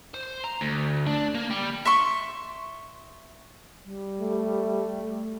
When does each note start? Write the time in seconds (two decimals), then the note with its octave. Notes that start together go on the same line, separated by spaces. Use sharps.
0.14 C5
0.44 A#5
0.61 D2
1.07 D4
1.35 A#3
1.51 G3
1.85 E5 C6 C#6
3.84 G3
4.21 A3